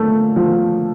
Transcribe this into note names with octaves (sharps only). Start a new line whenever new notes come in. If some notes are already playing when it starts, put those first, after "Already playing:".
Already playing: A#2 A3
F3